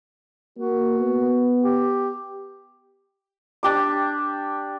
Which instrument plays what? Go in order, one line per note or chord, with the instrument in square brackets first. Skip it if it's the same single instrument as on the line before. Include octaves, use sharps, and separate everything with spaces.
[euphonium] A#3 [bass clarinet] F#4
[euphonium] B3
[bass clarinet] G4
[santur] D4 G4 D6